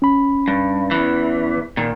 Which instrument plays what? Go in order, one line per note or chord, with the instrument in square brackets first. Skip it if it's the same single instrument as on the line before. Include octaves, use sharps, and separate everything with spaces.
[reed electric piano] C#4 B5
[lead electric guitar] G2
E2 E3
A#2 D#3